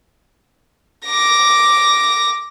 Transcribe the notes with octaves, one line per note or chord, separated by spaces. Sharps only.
D6 A#6